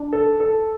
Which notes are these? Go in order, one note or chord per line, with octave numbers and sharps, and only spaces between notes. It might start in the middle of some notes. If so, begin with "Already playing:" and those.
Already playing: D4
A4
A4